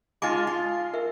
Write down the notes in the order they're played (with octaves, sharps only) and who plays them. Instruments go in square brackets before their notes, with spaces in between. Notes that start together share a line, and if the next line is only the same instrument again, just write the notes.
[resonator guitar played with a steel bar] G#3 F4 [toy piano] D#4 G#5 D6
[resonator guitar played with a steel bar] F4
[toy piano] A#4 E5